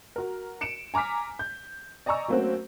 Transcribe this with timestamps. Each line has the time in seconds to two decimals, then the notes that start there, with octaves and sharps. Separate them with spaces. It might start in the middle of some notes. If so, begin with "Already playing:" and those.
0.16 F#4 A#4
0.61 C#7 D7 E7
0.94 G#5 A#5 D6 F6 B6
1.39 G6
2.06 D5 D#5 G#5 A#5 C#6 E6
2.28 F#3 A3 A#3 C4 C#4 F#4